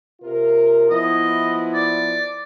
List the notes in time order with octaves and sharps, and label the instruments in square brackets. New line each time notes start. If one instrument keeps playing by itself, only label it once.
[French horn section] C3 F4 A#4
[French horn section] F3 B3 E4 [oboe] D#5
[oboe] D5